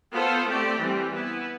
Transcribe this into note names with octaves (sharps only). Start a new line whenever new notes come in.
B3 F4 A4 C5
A3 C4 G4 D5
E3 G3 C4
B3 E4 B4